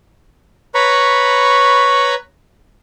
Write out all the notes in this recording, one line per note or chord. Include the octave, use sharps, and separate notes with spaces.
B4 C#5 A#5 B5 C#6